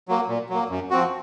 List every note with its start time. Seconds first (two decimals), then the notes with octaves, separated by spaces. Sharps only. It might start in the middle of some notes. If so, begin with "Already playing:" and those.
0.08 F#3 A#3
0.28 A#2
0.49 F#3 A#3
0.70 F#2
0.90 F3 C4 F#4